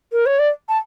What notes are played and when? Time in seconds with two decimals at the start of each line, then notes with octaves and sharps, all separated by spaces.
0.12 A#4
0.26 C#5
0.39 D5
0.69 A5